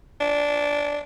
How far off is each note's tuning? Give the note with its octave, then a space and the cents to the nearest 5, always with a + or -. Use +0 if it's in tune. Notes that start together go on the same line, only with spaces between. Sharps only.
D4 -10